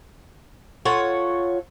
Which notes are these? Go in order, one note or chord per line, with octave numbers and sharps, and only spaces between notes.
F4 A4 C#5 F#5